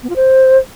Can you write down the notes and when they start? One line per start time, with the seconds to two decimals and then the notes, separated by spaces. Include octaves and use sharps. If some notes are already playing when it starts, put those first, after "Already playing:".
0.03 B3
0.09 F4
0.16 C5